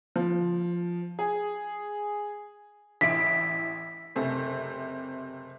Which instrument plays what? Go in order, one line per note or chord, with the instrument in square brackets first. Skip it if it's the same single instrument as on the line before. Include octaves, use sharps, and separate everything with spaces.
[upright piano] F3
G#4
[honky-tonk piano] A1 E4 D7 [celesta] B6
[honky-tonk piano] F#1 C3 A3